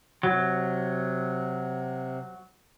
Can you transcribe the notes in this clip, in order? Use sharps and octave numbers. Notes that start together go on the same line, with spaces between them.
C3 F#3